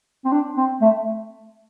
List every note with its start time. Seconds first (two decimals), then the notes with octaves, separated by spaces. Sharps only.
0.25 C4
0.32 D4
0.57 C4
0.81 A3